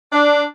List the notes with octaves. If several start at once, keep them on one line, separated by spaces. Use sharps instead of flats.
D4